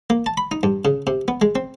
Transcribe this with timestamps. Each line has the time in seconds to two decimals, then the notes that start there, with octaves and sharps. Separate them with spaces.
0.10 A#3
0.26 A5
0.37 B5
0.51 D#4
0.63 G2
0.85 C#3
1.07 C3
1.28 B3
1.41 G#3
1.55 C4